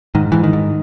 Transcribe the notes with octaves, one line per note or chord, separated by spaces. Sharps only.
G#2 D#3
G#2 E3
D#3
G#2